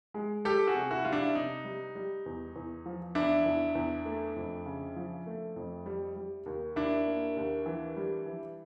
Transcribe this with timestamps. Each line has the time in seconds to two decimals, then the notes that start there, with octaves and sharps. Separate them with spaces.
0.14 G#3
0.45 G3 G4 A4
0.67 F#4 G#4
0.75 C3
0.90 E4 F#4
1.05 G3 F4
1.12 D4 E4
1.35 C3 D#4
1.65 G3
1.95 G3
2.26 E2
2.56 E2
2.86 F3
3.15 E2 D4 E4
3.46 E2
3.75 E2
4.05 A3
4.36 F2
4.66 C#3
4.96 F3
5.26 A3
5.56 F2
5.86 G3
6.16 G3
6.46 D#2
6.76 D#2 D4 E4
7.06 A#3
7.37 D#2
7.66 E3
7.97 G3
8.26 E3